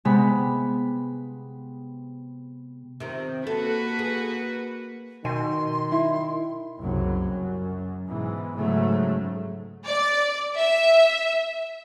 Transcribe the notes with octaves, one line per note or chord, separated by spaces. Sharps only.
C3 G#3 B3 B5
C3 D#3 F3
A#3 F#4 A4 B4
G#4
B2 D#3 G#5 C6
E4
F#1 C2 F#3
F#2
G#2 B2 E3
G#2 C#3 F#3 A3
D5
E5